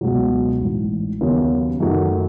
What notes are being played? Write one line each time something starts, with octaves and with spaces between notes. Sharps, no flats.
C#2 B2 F#3
A1 G#2 E3
D#2 C#3 F#3 B3
F#2 D#3 F#3 A3